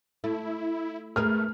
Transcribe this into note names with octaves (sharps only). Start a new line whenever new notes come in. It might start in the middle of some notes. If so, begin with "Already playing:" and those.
A3 E4
A3 G#4 A#4 B4 F6